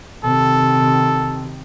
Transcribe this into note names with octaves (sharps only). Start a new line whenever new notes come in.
C3 D#3 A4